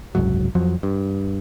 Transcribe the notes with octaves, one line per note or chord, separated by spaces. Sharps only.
F#1 C2 G#2 F#3
F2 F3 F#3
G2